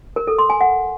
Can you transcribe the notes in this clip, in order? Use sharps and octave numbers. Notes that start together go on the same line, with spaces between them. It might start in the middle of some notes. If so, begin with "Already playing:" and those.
A#4
A4
C6
G#5
F#5